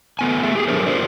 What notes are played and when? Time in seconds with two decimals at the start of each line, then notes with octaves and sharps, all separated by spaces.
0.19 A3 B3 G#5
0.43 A3 G#4 E5
0.55 G4 G#4
0.68 F#3 D4 G4 A4 A#4 C5
0.86 F4 G4 A4 A#4 C5 D5